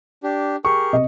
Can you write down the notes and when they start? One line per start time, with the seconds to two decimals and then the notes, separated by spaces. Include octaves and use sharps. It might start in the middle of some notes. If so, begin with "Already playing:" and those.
0.23 D4 G4
0.65 G4 G#4 A#4 C#6
0.93 C3 D#5